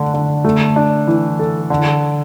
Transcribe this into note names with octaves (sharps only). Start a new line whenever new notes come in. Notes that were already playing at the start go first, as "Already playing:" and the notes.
Already playing: D3 A3 D4
D3
A3
D4
E3
A4
D3